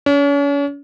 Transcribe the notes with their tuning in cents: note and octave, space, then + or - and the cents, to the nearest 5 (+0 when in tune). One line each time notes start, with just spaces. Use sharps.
C#4 +40